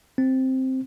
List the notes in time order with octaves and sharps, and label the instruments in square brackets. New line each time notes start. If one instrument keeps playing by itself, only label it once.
[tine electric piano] C4